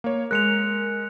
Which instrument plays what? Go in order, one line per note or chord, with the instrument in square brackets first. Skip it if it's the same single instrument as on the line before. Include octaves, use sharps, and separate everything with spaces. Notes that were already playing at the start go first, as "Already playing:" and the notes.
[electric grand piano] A#3 C#5
[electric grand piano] G#3 A#4 [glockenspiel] F#6 C#7 F7